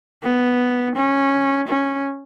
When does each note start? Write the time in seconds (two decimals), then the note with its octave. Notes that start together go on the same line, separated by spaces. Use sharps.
0.23 B3
0.96 C#4
1.67 C#4